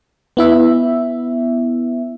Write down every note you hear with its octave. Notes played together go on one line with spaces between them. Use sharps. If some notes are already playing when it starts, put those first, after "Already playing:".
B3 E4 E5